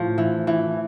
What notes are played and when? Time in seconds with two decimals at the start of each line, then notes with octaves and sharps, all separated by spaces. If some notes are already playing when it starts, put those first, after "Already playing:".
Already playing: A2 F3
0.18 E3
0.47 E3